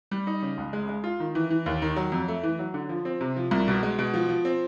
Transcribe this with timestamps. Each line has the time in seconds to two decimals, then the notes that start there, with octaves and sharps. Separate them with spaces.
0.11 G3
0.27 D#4
0.42 C#3
0.58 C#2
0.73 G#3
0.89 G#3
1.04 F4
1.20 D#3
1.35 E3
1.50 E3
1.66 D#2
1.82 D#3
1.96 F#3
2.12 F2
2.28 A3
2.43 E3
2.59 F#3
2.74 D3
2.89 F3
3.05 C4
3.21 C3
3.36 F3
3.51 C2
3.68 B2
3.83 G#3
3.99 B2
4.14 F3
4.29 F3
4.45 C4